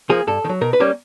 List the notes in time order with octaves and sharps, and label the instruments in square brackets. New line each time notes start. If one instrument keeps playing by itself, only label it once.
[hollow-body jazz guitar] F3 A#3 G#4
G2 A4
D#3
F#3
B2 A#4
B4
G3 A#3 C#4